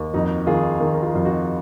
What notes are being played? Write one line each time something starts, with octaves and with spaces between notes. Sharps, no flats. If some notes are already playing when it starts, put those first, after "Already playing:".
Already playing: D#2
F2 D#4 F#4
D#3 F4 G#4
D#3
A#4
F4 G#4
F2 F4
D#4 F#4